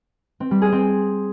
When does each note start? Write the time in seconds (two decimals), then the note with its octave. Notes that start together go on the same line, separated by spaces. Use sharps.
0.40 C4
0.51 G3
0.62 G#4
0.72 C4